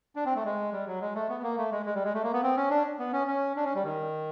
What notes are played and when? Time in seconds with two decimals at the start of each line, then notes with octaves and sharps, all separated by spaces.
0.16 D4
0.26 C4
0.35 A3
0.44 G#3
0.72 G3
0.87 F#3
1.01 G#3
1.15 A3
1.29 B3
1.43 A#3
1.57 A3
1.72 G#3
1.86 G#3
1.95 G3
2.04 G#3
2.14 A3
2.23 A#3
2.33 B3
2.43 C4
2.57 C#4
2.70 D4
2.99 B3
3.13 C#4
3.27 C#4
3.56 D4
3.65 C#4
3.75 G3
3.84 D#3